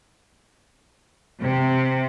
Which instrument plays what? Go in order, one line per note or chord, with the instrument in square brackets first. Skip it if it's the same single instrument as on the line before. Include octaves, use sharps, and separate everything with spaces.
[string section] C3